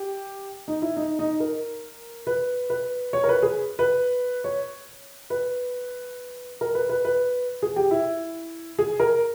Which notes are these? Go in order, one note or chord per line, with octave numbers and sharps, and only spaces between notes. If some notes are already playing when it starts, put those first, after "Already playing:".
Already playing: G4
D#4
E4
D#4
D#4
A#4
B4
B4
C#5
A#4
B4
G#4
B4
C#5
B4
A#4
B4
B4
B4
G#4
G4
E4
G#4
A#4